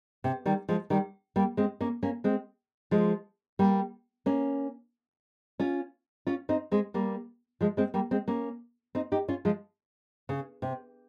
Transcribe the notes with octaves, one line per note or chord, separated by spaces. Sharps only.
C3
D#3 G3
F3 G#3
D#3 G3
G3 A#3
G#3 C4
A#3 C#4
A#3 C#4
G#3 C4
F3 G#3
G3 A#3
A#3 C#4
C#4 F4
C#4 F4
C4 D#4
G#3 C4
G3 A#3
F3 G#3
G#3 C4
G3 A#3
G#3 C4
A#3 C#4
C4 D#4
D#4 G4
C#4 F4
F3 G#3
C#3
C3